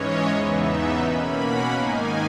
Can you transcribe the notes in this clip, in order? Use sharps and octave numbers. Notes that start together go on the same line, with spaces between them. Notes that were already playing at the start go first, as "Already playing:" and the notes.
Already playing: G#2 E3 G#3 C#4 C#5 D#5
E2 C#3 E3 B3 D#4 E5
B2 A#3 C#4 B5
F#5
G#2 D#3 A#3 D#4 G#5